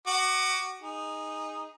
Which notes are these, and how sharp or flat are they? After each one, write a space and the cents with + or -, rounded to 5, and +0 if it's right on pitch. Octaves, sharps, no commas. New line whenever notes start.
F#4 +20 D6 +40
D#4 +0 G#4 -15